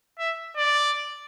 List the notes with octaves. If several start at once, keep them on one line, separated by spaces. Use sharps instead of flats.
E5
D5